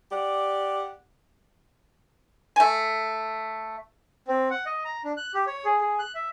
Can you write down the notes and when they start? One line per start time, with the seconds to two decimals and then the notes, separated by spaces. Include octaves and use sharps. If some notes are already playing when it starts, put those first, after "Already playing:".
0.12 G4 D5 F#5
2.56 A3 G#5
4.28 C4
4.50 F#5
4.66 D#5
4.85 A#5
5.04 D4
5.17 F#6
5.34 G4
5.47 C#5
5.65 G#4
5.81 G#4
5.99 F#6
6.15 E5